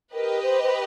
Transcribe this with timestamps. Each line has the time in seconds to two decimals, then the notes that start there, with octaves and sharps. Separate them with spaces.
0.14 G4 A#4 B4 D#5
0.43 C5
0.63 C5